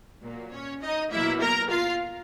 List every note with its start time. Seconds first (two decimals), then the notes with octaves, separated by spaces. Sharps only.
0.23 A#2 F#3 A#3
0.52 C#4 C#5
0.82 D#4 D#5
1.11 B2 F#3 A#3 E4 E5
1.41 A#4 A#5
1.70 F4 F5